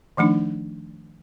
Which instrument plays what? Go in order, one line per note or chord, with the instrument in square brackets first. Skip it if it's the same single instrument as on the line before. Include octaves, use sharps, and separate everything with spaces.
[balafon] D#3 F3 A3 D4 D#4